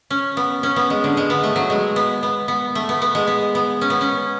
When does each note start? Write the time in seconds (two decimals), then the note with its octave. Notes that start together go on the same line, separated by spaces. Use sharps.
0.10 C#4
0.37 B3
0.63 C#4
0.76 B3
0.90 G#3
1.04 D3
1.17 G#3
1.30 B3
1.43 A3
1.56 F#3
1.70 G#3
1.96 B3
2.23 B3
2.48 B3
2.75 A3
2.89 B3
3.02 B3
3.15 G#3
3.27 B3
3.55 B3
3.81 C#4
3.90 B3
4.01 C#4